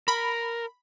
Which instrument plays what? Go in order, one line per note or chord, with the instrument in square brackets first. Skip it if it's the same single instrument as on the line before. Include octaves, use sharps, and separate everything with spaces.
[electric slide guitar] A#4 [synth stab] B5